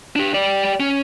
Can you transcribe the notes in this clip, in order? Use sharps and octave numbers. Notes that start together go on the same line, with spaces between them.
D4 G4
G4 D5
C#4